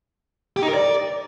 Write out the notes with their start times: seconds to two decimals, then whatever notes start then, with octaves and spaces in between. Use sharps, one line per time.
0.56 G4
0.62 D#4
0.68 A#4
0.74 D5